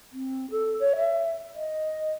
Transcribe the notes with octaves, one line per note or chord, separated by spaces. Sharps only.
C4
A4
C#5
E5
D#5